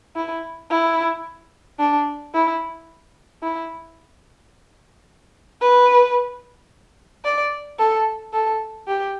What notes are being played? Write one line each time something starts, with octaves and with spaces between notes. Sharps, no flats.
E4
E4
D4
E4
E4
B4
D5
A4
A4
G4